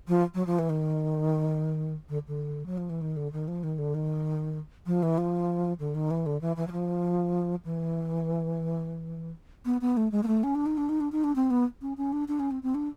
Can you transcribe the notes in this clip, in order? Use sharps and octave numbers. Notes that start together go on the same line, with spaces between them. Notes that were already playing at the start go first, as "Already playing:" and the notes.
F3
F#3
F3
E3
D#3
D3
D3
F#3
F3
E3
D#3
D3
D#3
F3
D#3
D3
D#3
F3
E3
F3
D3
D#3
E3
D3
E3
E3
F#3
F3
E3
B3
B3
A3
G#3
A#3
A3
C#4
D4
D#4
D4
D#4
D4
D#4
D4
C4
B3
C#4
C#4
D4
D4
C#4
C4
C4
D4